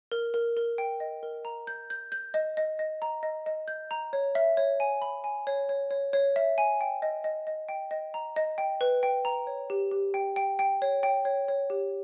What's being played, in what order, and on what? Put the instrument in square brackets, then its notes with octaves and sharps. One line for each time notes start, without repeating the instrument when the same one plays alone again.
[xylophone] A#4
A#4
A#4
G5
D#5
A#4
A#5
G6
G6
G6
D#5
D#5
D#5
A#5
D#5
D#5
G6
A#5
C#5
E5
C#5
G#5
B5
G#5
C#5
C#5
C#5
C#5
E5
G#5
G5
D#5
D#5
D#5
G5
D#5
A#5
D#5
G5
B4
G5
A#5
C#5
G4
G4
G5
G5
G5
C#5
G5
C#5
C#5
G4